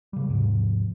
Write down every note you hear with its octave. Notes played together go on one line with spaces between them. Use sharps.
C#3 G3
D#2 G#2 C3 F3